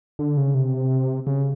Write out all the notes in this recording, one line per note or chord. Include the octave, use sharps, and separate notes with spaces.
D3
C#3
C3
C#3